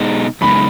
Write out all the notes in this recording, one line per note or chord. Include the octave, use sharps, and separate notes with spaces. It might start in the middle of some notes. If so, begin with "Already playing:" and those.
Already playing: B2 G#3 D#4
F#2 C#3 G#3 B3 D#4 B5